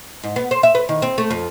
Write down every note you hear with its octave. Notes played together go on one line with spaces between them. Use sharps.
G#2
B3
C5
E5
B4
D#3
C4
A3
F2